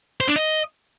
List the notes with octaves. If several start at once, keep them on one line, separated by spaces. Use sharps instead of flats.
C5
D4
D#5